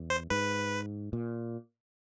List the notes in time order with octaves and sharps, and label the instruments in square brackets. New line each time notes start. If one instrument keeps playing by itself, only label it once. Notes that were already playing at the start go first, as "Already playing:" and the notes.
Already playing: [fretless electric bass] E2
[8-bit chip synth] C5
[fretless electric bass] G#2 [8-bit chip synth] B4
[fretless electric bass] A#2